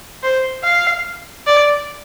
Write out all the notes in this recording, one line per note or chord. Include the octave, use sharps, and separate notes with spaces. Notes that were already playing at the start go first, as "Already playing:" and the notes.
C5
F5
D5